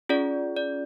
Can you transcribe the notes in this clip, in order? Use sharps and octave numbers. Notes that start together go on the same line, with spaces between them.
C#4 F4 G#4 D5
D5